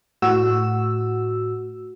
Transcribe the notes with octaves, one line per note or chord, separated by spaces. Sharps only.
A2 F#4 E6